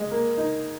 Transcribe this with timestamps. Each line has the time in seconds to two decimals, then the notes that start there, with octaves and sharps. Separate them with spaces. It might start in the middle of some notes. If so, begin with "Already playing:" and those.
Already playing: G#3
0.11 A#3
0.37 D#4